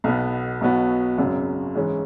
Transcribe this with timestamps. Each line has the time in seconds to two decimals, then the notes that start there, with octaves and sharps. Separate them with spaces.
0.04 B1 B2 B3
0.61 B1 B2 F#3 B3 F#4
1.18 G#1 F#2 C#3 F#3
1.75 G#2 E3 G#3 C#4